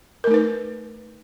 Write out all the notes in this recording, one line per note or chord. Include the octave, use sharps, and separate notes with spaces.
A3 D#4 A#4 B4